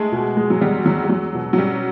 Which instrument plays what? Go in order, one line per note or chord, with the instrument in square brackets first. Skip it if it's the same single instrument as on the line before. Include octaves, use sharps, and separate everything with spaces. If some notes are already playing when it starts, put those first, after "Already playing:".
Already playing: [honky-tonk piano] G#3 [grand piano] A3
[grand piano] B2
G#3
[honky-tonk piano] F#3
[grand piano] E2 [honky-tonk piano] G3
[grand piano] E2 [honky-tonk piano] F#3
[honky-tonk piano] G3
[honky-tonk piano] F#3 [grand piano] G#3
[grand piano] B2
[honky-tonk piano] F#3
[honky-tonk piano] G3 [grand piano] C#4